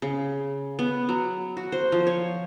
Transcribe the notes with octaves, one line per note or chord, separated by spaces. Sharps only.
C#3
B3
F#3
F#4
C5
F3
C#5